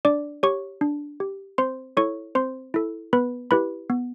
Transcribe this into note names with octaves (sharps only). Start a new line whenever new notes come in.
D4 D5 D6
G4 C#5 C#6
D4
G4
C4 C5 C6
E4 A4 C#5 C#6
C4 C5 C6
E4 A4
B3 B4 B5
E4 G4 B4 B5
B3